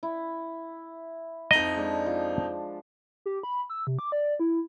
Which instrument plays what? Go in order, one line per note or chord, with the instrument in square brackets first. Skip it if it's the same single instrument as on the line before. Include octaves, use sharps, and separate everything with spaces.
[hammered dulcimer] E4
[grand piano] F2 D#4 A#5 [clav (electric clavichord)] D#5
[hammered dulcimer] G#3 D4
F3
[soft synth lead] G4
B5
E6
C3
D6
D5
E4